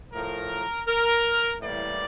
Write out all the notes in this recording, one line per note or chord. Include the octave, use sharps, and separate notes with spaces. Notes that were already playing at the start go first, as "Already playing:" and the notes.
A2 F3 A3 A#4
A#4
A2 E3 G3 A#3 D5